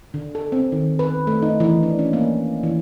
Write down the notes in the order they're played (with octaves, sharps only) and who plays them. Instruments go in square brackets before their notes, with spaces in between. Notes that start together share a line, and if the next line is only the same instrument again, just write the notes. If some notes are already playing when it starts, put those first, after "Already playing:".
[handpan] D3
A4
C4
D#3
B4
A3
D#4
E3
D4
C#4
A#3
E3